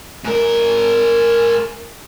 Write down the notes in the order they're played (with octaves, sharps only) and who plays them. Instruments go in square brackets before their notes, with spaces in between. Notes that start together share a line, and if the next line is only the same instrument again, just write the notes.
[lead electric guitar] G#2 A#4